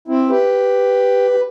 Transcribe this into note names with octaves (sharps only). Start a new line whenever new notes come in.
C4 E4
G4 B4
G4